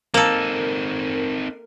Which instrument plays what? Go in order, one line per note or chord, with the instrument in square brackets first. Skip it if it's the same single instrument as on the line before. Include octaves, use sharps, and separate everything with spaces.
[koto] A#3 A4 [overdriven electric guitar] C4 D#4 [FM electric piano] A#4